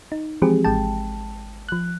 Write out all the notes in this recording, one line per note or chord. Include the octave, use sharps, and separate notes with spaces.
D#4
E3 F3 G#3 C4 G4 G#4
G#1 G#3 G5 A5
F3 F#6